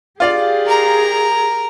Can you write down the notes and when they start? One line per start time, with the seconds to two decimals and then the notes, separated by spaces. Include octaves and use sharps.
0.20 F4 G4 G#4 D5 F5
0.66 A#4 A#5